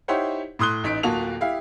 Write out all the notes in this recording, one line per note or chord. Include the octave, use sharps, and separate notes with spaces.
D#4 E4 G4 C5 C#5 F#5
A2 C6 D#6 F#6 G7
A1 D#4 B6 D7
D1 A#3 F4 F#4 A5 F7
E4 G4 F5